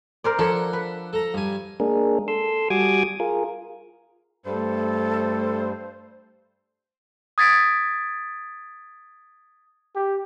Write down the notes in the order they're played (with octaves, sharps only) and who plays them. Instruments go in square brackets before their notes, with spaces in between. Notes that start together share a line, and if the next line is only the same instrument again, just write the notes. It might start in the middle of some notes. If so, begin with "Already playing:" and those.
[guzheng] A#4 C5 D5
[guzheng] F3 C#5 [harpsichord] D4 A4 F#5
[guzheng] B4
[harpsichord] A4 A#5
G2 G#5
[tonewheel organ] G#3 A#3 D4 G#4 A#4
A4 C6 E6
G3 F#4 G#5 D6 D#6 G#6
F4 G#4 A#4
[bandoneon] G2 [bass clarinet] A3 [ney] A4 [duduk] C5
[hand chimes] D#6 G#6 A6 B6 D7
[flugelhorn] G4